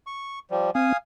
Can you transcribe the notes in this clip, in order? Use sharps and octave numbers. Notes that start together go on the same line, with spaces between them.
C#6
F3 G3
C4 F5 G#5 D#6